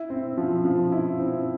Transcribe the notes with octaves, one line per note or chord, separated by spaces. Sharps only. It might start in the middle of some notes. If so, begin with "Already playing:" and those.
Already playing: E4
C4
F3
F3
E4
C4